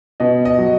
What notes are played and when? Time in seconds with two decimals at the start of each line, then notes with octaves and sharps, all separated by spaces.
0.20 B2 D#5
0.45 D#5
0.58 F#3